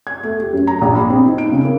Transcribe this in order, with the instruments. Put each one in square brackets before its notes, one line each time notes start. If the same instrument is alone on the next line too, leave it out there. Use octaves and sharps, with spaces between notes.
[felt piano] G#6
A3
G4
F#2
A#5
A#1
B5
C4
D#4
D7
C#3
A#3